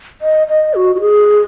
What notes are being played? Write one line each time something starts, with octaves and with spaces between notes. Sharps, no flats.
D#5
D#5
F#4
F#4
G#4